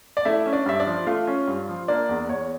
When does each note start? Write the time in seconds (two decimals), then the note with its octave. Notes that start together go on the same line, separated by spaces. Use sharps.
0.17 D5
0.25 A3 E4 E5
0.46 C#4
0.53 D4 D5
0.66 G2 E5
0.80 D4 D5
0.87 F3
1.07 A3 F4 F5
1.27 C#4
1.48 G2
1.69 F3
1.88 A#3 D4 D5
2.09 E2
2.29 E2 C#5